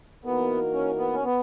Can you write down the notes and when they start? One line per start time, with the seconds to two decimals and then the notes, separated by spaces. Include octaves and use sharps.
0.25 E3 A#3 B3 D#4 F#4 A#4
0.74 C#4
0.98 B3
1.13 C#4
1.24 B3